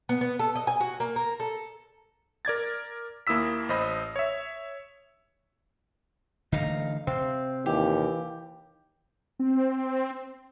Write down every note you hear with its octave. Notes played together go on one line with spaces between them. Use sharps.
B3
B3
A4
D#5
G#5
F#4
A#3
A#4
A4
A#4 D5 G#6 A6
D#2 A#3 E4 D#6 E6 B6
A1 C5 D#5 B5
C#5 E5
D3 E3 A3 D#4 F5 A#5
C3 C4 F5
D#2 E3 G4
C4